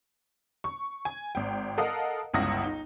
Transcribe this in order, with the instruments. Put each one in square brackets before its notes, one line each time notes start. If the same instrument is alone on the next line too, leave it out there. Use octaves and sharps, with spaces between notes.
[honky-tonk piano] C#6
G#5
G#1 G5
A4 A#4 D#5 F5 F#5 D#6
G1 C#2 E4 F#5 D#6 A#6
D#4